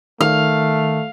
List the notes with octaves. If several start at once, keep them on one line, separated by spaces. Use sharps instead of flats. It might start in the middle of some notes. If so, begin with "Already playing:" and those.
D#3 A3 F5